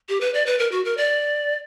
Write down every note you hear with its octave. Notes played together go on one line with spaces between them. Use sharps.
G4
B4
D5
B4
A#4
F#4
A#4
D5